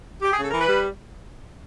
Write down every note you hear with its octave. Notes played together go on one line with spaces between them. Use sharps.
G4
C#3 G#4
A4
E3 A#4
B4
G3